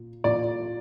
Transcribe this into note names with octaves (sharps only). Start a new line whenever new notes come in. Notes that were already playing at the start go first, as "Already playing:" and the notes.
Already playing: A#2
A#2 D5